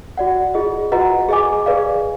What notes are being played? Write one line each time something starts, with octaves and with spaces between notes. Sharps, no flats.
F#4 D5 F#5
F4 G#4 D#5
F#4 B4 D#5 F#5 A#5
G#4 D#5 G#5 D6
G#4 B4 D5 F5